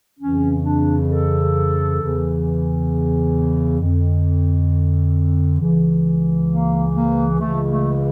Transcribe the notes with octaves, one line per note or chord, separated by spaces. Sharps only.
F2 C#3 E3 C#4
D4
A4
E2 C#3 E3
F2 D3
C#2 C#3 E3
A#3
A#3
C#2 C#3 E3 A3
A3